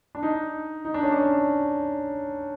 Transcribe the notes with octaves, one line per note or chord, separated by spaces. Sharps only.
D4
D#4
D#4
D4
C#4
D4